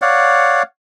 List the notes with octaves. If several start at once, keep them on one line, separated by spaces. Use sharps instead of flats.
C#5 D5 F5 F#5